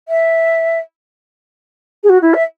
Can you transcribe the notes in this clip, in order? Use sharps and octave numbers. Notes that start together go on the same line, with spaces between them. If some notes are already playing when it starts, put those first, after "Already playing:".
E5
G#4
F#4
E4
E5